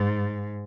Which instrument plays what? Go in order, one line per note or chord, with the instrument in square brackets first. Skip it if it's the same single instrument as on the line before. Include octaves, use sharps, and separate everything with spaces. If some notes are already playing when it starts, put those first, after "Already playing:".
Already playing: [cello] G#2